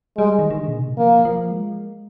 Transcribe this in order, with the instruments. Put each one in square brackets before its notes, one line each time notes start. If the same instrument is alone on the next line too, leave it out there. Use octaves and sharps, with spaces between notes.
[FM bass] G3 [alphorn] G#3
[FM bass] D#3
D#3
D3
A#2
C3
[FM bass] F3 [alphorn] A#3
[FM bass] F3
G#3